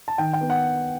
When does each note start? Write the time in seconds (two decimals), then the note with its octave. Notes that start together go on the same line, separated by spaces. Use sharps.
0.08 A5
0.18 D#3 G5
0.33 G5
0.41 B3
0.50 F#5